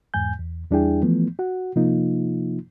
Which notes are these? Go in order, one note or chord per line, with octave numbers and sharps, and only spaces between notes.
E2 G#2 G#5 G6
E2
E2 G3 D4 E4 G#4 G5
E3 F3 A3 B3
F#4 F#5
C3 F3 A#3 D#4 F4